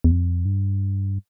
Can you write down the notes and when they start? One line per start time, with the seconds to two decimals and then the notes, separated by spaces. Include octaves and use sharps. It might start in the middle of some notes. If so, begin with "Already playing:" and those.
0.04 E2
0.11 F2
0.45 G2